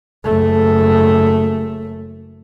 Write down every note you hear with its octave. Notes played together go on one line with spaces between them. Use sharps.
F#1 A3